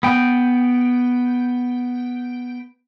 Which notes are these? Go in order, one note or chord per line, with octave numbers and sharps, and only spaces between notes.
B3 G5